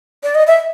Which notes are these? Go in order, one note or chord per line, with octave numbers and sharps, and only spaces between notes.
D5
D#5
E5